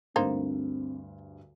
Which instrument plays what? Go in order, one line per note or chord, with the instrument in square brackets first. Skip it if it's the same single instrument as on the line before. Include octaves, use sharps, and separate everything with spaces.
[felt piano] D2 G2 [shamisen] A#3 D#4 C5 [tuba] C4